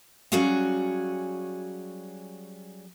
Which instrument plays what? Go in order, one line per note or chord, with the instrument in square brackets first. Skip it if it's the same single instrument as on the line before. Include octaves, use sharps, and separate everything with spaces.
[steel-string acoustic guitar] F#3 G3 C#4 F#4 G#4 F5